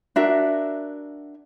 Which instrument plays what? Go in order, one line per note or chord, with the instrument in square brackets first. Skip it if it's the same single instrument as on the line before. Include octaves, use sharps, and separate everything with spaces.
[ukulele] D4 F#4 A#4 E5